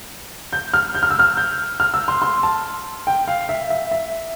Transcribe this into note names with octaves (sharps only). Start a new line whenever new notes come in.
G6
F6
G6
F6
E6
F6
G6
F6
E6
C6
C6
A5
G5
F5
E5
E5
E5